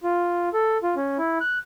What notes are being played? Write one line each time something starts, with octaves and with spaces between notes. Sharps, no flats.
F4
A4
F4
C#4
E4
F#6